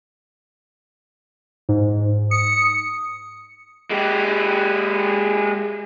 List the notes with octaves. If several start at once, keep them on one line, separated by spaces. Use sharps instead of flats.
G#2
D#6 C#7
G#3 G4